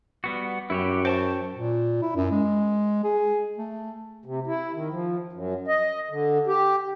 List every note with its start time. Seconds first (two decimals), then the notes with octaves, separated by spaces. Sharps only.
0.24 G3 B3 F#4
0.70 F#2 E4 F#4 G4
1.05 C5 G5 A5 C#6
1.53 A#2
2.02 E4
2.16 F#2
2.31 G#3
3.04 G#4
3.58 A3
4.26 C3
4.47 E4
4.74 D#3
4.90 F3
5.33 F#2
5.68 D#5
6.10 D3
6.47 G4